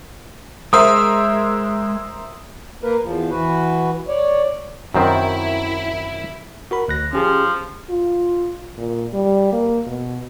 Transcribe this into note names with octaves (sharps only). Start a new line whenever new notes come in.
G#3 A#4 C5 E5 D#6
A#3 A#4 B4
E2 F3
E3 F#4 B4
C#5 D5
F#2 D#3 C4 E4
F#4 A#4 B5
D2 F#6 A#6
F3 C#4 G4 G#4
F4
A#2
G3
A#3
B2